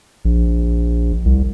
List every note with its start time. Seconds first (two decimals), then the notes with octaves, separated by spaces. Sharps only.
0.25 A#1
1.25 C2